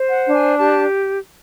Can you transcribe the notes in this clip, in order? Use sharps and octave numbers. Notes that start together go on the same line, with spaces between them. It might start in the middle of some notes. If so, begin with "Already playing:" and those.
Already playing: C5
F#5
D4
G#5
G4 A5